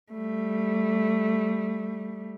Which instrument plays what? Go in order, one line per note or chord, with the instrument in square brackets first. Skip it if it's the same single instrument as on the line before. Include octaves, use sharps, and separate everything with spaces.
[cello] G3 A3